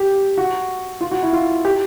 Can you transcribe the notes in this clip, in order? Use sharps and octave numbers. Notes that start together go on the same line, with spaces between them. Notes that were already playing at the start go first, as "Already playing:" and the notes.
Already playing: G4
F#4
F4
F#4
E4
F4
G4